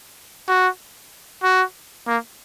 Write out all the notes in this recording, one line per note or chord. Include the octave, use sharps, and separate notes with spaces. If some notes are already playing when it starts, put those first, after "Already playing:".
F#4
F#4
A#3